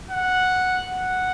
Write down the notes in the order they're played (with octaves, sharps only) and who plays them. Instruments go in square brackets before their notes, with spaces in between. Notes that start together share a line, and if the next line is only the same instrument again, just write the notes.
[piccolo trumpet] F#5
F#5